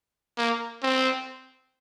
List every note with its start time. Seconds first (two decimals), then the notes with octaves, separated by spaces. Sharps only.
0.38 A#3
0.83 C4